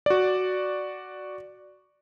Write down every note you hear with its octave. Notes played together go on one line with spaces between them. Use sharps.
F#4 D5